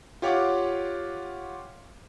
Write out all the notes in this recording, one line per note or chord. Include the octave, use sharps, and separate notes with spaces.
F4 G4 C#5 F5 F#5 D6